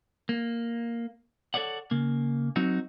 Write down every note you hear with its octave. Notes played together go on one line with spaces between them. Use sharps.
A#3
A4 B4 C#5 D5 F#5
C#3 A#3
F#3 C4 D#4 F#4